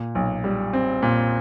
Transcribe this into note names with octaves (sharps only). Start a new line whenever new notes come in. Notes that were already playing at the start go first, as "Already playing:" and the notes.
Already playing: A#2
B1
G3
C4
A#2